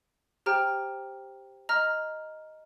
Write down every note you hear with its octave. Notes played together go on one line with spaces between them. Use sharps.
G4 C5 G5 A#5 F6
D#5 A#5 F6